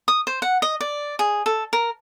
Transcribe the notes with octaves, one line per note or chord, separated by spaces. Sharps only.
D#6
C5
F#5
D#5
D5
G#4
A4
A#4